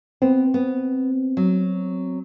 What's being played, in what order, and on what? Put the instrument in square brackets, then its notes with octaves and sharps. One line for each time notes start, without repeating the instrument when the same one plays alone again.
[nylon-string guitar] B3 [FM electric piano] C4
[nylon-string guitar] B3
F#3